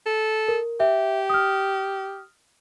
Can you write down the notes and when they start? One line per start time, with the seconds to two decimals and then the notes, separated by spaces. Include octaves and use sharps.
0.06 A4
0.48 A#4
0.80 G4 E5
1.30 D#6 F6